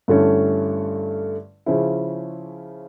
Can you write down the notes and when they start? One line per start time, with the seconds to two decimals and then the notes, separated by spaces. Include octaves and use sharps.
0.08 G2 D3 A3 C#4 E4
1.66 C#3 F3 C#4 E4